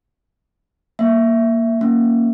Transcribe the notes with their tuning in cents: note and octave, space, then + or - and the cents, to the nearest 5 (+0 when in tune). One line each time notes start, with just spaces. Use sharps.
A#3 +0 E5 +0
A#3 +0 C#4 +0